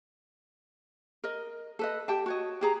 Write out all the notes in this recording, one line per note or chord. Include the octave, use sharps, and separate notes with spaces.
A#4 D#5
A4 B4 D#5
G4 G5 A5
F#4 C#5 D#5
G4 G#4 A#5